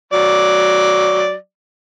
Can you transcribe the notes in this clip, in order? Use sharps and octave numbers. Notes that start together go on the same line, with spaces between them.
F#3 D5